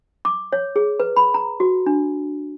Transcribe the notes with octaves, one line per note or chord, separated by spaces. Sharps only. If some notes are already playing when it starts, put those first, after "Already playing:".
D6
C#5
G#4
B4
B5
A#5
F#4
D4